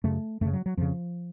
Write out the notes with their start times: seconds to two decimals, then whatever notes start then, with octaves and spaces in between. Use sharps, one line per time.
0.04 F#2 C#3 A3
0.41 F#2 C#3 A3
0.53 F#3
0.66 F#3
0.77 F2 C#3 F3